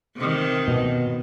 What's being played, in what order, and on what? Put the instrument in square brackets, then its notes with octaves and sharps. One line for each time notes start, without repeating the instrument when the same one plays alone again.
[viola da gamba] C3 D#3
[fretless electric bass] B2